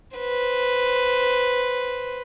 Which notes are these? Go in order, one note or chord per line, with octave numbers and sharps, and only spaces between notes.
B4 C5